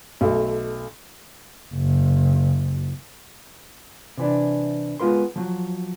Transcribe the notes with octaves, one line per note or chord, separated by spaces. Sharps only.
B1 A3
F#1
C3 E3 D4
G#3 B3 F4 A#4 C6
F3 F#3